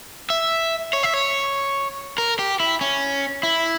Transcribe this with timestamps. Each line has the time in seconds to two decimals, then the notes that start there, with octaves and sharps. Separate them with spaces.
0.30 E5
0.93 C#5
1.03 E5
1.14 C#5
2.18 A#4
2.39 G4
2.60 E4
2.81 C#4
3.43 E4